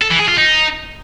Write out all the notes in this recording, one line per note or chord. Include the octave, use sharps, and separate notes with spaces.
A4
E3
G#4
F4
D#4